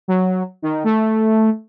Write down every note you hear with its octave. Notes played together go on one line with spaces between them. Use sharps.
F#3
D#3
A3